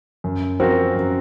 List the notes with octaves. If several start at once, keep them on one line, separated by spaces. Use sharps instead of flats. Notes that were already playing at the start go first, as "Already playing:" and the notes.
F#2
F3 C4 F#4 A#4
F#2